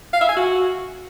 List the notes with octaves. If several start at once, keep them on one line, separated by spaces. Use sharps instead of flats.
F5
E5
G#5
F#4